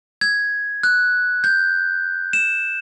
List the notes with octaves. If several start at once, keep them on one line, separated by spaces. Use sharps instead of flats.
G#6
F#6
G6
E7